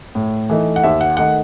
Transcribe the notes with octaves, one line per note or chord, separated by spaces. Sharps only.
A2
E3 A3 D#4
F#5
D#2 E5
F#5
D#3 A3 D#4 F#5